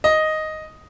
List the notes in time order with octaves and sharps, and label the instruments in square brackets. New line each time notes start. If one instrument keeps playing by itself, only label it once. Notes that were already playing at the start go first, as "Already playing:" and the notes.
[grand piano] D#5